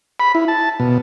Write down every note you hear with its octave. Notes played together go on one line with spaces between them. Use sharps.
B5
E4
A5
B2